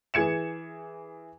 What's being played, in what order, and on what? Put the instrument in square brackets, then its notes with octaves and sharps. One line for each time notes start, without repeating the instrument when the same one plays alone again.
[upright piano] E3 G#4 G#6 C#7 E7